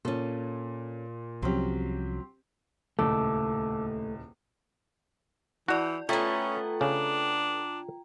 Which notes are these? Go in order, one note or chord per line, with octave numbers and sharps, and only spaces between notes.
A#2 C#4 A4
C2 F3 F#3 C4 C#4 G4
D#1 C#2 A2 A3 A5 D6 E6
E3 E4 F#4 D5
A3 B3 C#4 F4 G5 A#5
C#3 D4